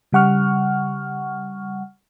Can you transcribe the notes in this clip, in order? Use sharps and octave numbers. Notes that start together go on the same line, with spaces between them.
C#3 G3 F#5 C#6 F6